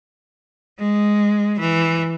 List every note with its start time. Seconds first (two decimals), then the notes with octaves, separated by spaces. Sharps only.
0.79 G#3
1.59 E3